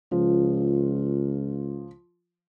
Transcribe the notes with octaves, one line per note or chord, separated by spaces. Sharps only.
C#2 F3